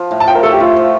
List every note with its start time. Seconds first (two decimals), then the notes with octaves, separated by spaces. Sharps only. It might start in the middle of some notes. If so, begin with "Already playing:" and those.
Already playing: F3
0.11 A2
0.20 A5
0.27 F3 G5
0.35 A#4
0.43 A3 A4
0.52 G4
0.60 A3 F4
0.76 F3